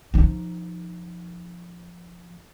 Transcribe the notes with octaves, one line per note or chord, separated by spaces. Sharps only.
F3 D#4